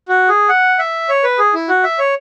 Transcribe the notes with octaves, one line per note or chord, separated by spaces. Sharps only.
F#4
G#4
F#5
E5
C#5
B4
G#4
E4
F#4
E5
C#5